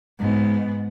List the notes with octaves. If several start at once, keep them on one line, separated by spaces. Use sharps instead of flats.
G#2 B3